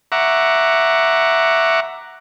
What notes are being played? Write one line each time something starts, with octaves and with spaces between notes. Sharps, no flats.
E5 F#5 A#5 C#6 D6